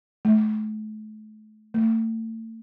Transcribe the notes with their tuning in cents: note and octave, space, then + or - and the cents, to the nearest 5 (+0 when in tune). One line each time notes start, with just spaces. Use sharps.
A3 -35
A3 +35